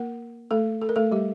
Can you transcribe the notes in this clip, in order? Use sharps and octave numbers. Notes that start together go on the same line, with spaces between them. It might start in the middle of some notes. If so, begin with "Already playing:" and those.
Already playing: A#3 A#4
A3 A4
A4
A#4
A3 A4
G3 G4